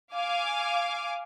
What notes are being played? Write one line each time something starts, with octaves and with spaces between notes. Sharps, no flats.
F5 G#5 D6